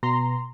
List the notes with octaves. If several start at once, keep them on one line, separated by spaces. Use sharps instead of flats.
B2 A#5 C6